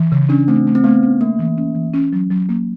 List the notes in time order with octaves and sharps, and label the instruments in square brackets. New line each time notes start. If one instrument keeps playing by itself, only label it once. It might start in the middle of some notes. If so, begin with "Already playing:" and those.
Already playing: [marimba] E3
C#3
[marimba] C#4 [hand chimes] D4
[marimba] A3 [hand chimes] C4
[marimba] A3
[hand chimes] C4
[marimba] A3 [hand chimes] B3
[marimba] C#4
[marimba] A3 [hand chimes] A#3
[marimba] E3
C#4
E3
C#4
F#3
F#3
A#3